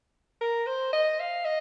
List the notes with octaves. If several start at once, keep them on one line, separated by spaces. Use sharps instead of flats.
A#4
C5
D#5
F5
D#5